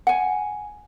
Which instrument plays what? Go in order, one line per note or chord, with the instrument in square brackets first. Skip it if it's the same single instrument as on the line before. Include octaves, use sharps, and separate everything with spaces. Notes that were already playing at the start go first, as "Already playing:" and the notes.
[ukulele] F#5 G#5